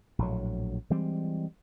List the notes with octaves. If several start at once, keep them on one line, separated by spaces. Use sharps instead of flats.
A#1 A2 F#3
E3 G3 G#3 C4